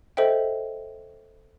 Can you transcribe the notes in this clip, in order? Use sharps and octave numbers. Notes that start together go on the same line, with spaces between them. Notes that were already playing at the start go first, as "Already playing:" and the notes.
A4 C5 D#5 E5 G5